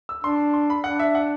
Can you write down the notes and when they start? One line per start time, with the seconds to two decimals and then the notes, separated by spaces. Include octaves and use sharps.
0.09 E6
0.24 D4 C6
0.54 C6
0.70 B5
0.84 D4 F#5
0.99 E5
1.15 F#5